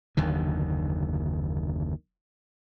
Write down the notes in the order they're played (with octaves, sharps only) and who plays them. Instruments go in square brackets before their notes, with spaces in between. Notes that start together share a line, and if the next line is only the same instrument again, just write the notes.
[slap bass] F#1 D#2 D3 D#3